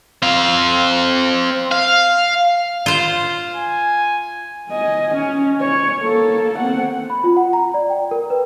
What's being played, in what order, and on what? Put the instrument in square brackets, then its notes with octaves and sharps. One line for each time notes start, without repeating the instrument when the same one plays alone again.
[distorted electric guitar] C4 F5
F5
[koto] F4 C5
[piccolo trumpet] G#5
[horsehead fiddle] D#5 G#5
C#4
C#5
A#3 A4
C4 F#5
[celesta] B5
F4
F#5
A#5
D5
G5
A#4
B4